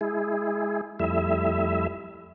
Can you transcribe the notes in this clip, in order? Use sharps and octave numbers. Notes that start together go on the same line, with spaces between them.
G#3 E4 G#4
F2 G3 A3 E4 E5